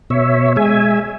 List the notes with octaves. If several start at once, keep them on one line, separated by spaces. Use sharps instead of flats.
B2 C#5 E5
G#3 E5 G#5